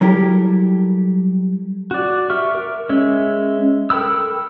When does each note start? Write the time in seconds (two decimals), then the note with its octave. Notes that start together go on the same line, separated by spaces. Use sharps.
0.01 F#3 G3 E4 G4 A4 A#4
1.91 F#4 D5
2.30 G4 E5 C#6 F6
2.55 A#4
2.89 G#3 C#4 E5
3.90 A4 A#4 G5 B5 E6